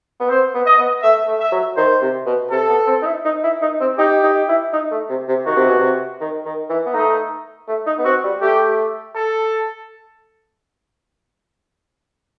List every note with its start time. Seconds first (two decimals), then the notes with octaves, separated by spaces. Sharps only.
0.20 B3
0.29 C4 C5
0.54 B3
0.66 D#5
0.78 B3
1.02 A3 E5
1.27 A3
1.40 E5
1.52 F#3
1.77 D#3 C5
2.01 C3
2.26 B2
2.51 C3 A4
2.69 B3
2.87 C4
3.02 D#4
3.06 E4
3.25 D#4
3.43 E4
3.61 D#4
3.80 C4
3.98 D#4 G4
4.23 D#4
4.48 E4
4.73 D#4
4.91 A3
5.09 C3
5.28 C3
5.46 D#3 F#4
5.56 C3
5.67 B2
5.78 C3
6.20 D#3
6.45 D#3
6.69 E3
6.86 B3
6.93 A3 D#4
7.68 A3
7.86 D#4
7.98 B3
8.05 C4 F#4
8.24 G3
8.41 A3 G4
9.15 A4